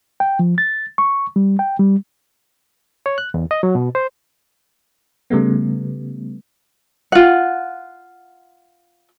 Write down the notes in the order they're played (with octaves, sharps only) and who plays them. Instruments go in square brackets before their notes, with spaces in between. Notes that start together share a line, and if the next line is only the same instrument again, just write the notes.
[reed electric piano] G5
F3
A6
C#6
G3
G5
G3
C#5
F#6
E2
D#5
F#3
B2
C5
[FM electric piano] C#3 G3 A3 B3
[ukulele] F4 F#5